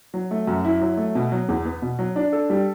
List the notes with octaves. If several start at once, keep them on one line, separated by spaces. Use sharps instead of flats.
F#3
A3
F#2
E4
F#3
A3
B2
F#3
E2
B3
B2
F#3
D4
A4
G3